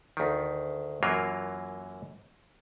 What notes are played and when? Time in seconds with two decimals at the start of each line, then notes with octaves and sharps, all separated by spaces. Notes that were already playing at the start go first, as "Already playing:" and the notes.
0.17 D2 D#3
1.03 F#2 E3 F#3 A#3 F4